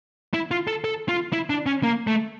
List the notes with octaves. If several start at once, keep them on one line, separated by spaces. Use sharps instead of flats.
E4
F4
A4
A4
F4
E4
D4
C#4
A#3
A3